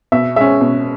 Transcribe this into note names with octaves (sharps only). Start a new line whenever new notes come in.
B2 E5
G#3 C#4 E5
B2